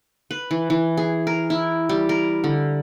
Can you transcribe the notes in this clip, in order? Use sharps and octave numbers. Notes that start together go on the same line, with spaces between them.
B4
E3
E3
G#4
A#4
E4
G3
A#4
D3